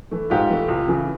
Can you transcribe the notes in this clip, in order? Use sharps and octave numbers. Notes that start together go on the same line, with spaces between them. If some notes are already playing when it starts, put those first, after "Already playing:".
E3 A3
G#2 F4 G4
E3 A3
C#2
C#3 E3